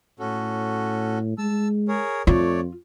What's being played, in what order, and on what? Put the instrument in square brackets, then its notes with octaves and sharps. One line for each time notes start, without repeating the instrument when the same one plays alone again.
[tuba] A2 [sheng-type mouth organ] C#4 F#4 A4
[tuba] G#3 [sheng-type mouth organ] A5 E6
[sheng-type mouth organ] G#4 A#4 C#5
[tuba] F2 [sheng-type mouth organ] A3 C#5 D5 [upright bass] F4